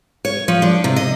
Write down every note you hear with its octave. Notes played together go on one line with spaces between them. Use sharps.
C#5
F3
D4
C3
D#5